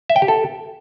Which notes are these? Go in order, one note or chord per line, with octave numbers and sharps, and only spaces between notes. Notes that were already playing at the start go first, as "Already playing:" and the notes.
E5
G5
G4
A4